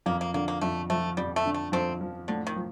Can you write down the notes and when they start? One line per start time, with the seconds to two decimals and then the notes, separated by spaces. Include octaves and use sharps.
0.06 F2 A#3
0.21 A#3
0.34 D3 A#3
0.48 A#3
0.61 F2 A3
0.90 F3 A3
1.17 F2 G3
1.36 A3
1.45 D3
1.54 A3
1.72 F2 A3 C4
2.01 F3
2.28 A2 D3
2.47 D#3
2.56 F3